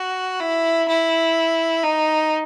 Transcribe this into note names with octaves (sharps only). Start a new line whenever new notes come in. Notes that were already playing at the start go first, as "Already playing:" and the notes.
Already playing: F#4
E4
E4
D#4